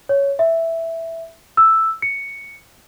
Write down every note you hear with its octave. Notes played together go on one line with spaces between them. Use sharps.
C#5
E5
E6
C#7